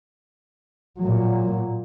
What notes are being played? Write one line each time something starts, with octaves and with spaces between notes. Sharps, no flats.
A#2 F#3